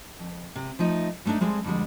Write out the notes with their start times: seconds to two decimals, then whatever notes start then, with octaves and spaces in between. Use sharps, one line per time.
0.19 F2
0.56 C3
0.79 F3 A3 D#4
1.25 G3 A3 C4 D4 D#4
1.41 G3 G#3 C4 G#4 A4
1.64 F2 D3 G3 G#3